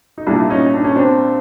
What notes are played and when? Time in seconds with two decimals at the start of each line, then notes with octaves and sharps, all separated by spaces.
0.18 D#4
0.27 C2 A#2 D4 E4
0.50 C#4 D#4
0.74 D4
0.84 C#4
0.96 C4 D4